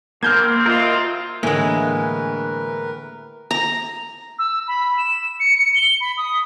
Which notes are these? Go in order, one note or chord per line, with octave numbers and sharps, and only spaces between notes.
A#1 A#3 C4 F6 G6 G#6
F4 A#4 D#5 E5
A2 D3 E3 G#3 A#3 A#4 B4 G#5
A#5
E6
B5
E7
C#7
C#7
G7
B5
D#6